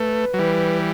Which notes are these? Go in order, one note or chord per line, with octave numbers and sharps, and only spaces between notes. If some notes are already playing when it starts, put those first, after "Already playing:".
Already playing: A3 B4
F#3
E3 G3